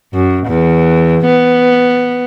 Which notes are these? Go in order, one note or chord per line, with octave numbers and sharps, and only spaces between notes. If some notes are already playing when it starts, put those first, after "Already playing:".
F#2
E2
B3